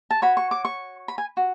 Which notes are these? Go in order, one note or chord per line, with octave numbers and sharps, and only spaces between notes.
A5
F#4 C#5 B5
C#6
D6
C#6
B5
G#5
F#4